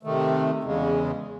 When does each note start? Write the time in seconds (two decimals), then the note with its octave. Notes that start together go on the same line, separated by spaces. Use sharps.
0.03 C3 D#3 A3
0.63 E2 C#3 G#3